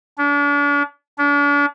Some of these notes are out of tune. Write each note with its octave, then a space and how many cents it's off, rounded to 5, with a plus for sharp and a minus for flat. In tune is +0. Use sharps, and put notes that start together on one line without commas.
D4 -40
D4 -40